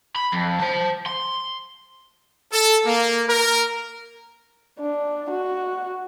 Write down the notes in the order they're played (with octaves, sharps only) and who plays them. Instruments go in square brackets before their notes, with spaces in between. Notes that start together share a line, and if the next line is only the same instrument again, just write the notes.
[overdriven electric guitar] B5
F2
C5 A5
C6
[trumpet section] A4
A#3
A#4
[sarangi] D4
F#4